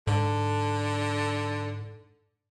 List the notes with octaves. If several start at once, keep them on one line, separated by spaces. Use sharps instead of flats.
G#2 D3